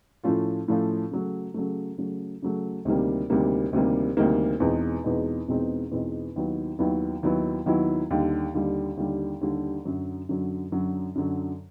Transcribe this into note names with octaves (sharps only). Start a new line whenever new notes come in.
A2 F3 A3 C#4 F4
A2 F3 A3 C#4 F4
C#3 F#3 A3
C#3 F#3 A3
C#3 F#3 A3
C#3 F#3 A3
D2 C3 D#3 G3 A#3
D2 C3 D#3 G3 A#3
D2 C3 D#3 G3 A#3
D2 C3 D#3 G3 A#3
E2 B2 G#3 C4 D#4
E2 B2 G#3 C4 D#4
E2 B2 G#3 C4 D#4
E2 B2 G#3 C4 D#4
D#2 D#3 F#3 B3 E4
D#2 D#3 F#3 B3 E4
D#2 D#3 F#3 B3 E4
D#2 D#3 F#3 B3 E4
D#2 D3 G3
D#2 D3 G3
D#2 D3 G3
D#2 D3 G3
F#2 D3 F#3
F#2 D3 F#3
F#2 D3 F#3
F#2 D3 F#3